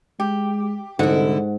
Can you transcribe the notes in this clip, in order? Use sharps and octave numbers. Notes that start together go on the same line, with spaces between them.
G#3 G4
C2 G#2 D3 E4 F#5